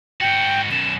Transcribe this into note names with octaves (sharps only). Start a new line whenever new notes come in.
G#2 F#4 G5
F#2 B2 E7